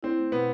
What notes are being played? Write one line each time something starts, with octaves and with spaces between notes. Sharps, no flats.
C4 E4
A3
B2 B3